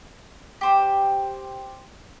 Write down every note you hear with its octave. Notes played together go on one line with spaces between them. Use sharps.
G4 C5